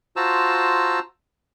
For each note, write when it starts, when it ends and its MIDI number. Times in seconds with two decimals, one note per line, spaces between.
0.16 0.99 65
0.16 0.99 66
0.16 0.99 72
0.16 0.99 81
0.16 0.99 82
0.16 0.99 88